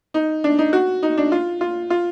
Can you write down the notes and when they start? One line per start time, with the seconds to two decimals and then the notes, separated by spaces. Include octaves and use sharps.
0.14 D#4
0.44 D4
0.59 D#4
0.73 F#4
1.03 D#4
1.18 D4
1.32 F4
1.61 F4
1.90 F4